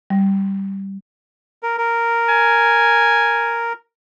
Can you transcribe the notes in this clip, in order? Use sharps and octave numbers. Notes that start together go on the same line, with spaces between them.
G3
A#4
A#4
G#5